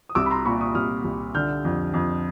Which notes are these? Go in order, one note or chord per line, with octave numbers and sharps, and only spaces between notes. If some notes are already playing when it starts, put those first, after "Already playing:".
D#6
C2 D6 E6
B5
A#5 C6
A#2 B5 C#6
C#6 D#6
C2 D#6 F6
C2
D3 F6 G6
F2
F2